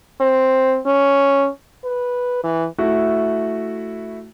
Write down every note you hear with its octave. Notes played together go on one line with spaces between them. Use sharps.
C4
C#4
B4
E3
A3 E4 F#4